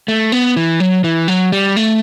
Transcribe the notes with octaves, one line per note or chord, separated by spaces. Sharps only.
A3
B3
E3
F#3
E3
F#3
G3
A3